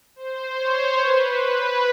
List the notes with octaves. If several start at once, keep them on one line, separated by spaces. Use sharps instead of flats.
C5
C#5
B4